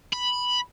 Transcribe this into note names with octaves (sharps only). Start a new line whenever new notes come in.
B5